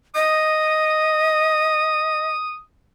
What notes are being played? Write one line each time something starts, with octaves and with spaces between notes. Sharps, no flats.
D#5 D#6